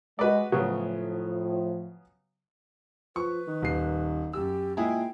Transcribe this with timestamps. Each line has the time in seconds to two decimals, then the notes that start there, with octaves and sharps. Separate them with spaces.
0.19 G#3 F#4 B4 D5
0.52 A2 C#3 F3 F#3 B3
3.16 F3 B4 C#6
3.48 D#3
3.62 D#1 C7
4.33 F#2 G4 E6
4.77 A#2 G#3 E4 G#4 G5